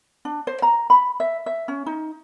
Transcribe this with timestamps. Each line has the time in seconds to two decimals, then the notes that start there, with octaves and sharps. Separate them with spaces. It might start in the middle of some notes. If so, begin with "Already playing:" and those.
0.25 D4
0.47 C5
0.62 A#5
0.90 B5
1.20 E5
1.46 E5
1.68 C#4
1.86 D#4